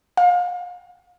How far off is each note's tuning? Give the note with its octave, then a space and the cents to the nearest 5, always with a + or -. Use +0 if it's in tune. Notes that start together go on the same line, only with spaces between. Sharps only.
F5 +35